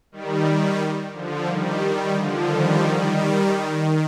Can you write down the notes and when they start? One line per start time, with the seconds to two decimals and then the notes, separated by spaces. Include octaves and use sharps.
0.12 D#3 G3
1.13 D3 F3
1.47 D#3 G3
1.81 D#3
2.15 D3 F3
2.48 D#3 G3
2.82 D#3 G3
3.16 D#3 G3
3.49 D#3